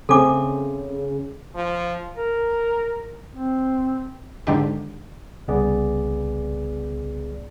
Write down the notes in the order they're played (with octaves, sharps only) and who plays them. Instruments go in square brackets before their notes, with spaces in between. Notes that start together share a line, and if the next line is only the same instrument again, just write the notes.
[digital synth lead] C#3 [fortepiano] A3 C4 G#5 [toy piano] A4 D6
[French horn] F3
[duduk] A#4
C4
[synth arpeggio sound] G#2 D3 D#3 G4
[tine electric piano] C2 C#3 B3 G#4 B4 D5